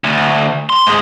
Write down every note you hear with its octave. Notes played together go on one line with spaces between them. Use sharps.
D2
C6
G#2 G#3